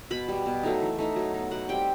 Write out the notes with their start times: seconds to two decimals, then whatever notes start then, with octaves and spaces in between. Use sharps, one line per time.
0.11 B2 B5
0.28 G3 B3
0.46 B2
0.63 F#3 A3 D#4
0.81 E3
0.98 A3 D#4
1.16 F#3
1.34 B3 D#4
1.51 B2 F#5
1.69 G3 C4 G5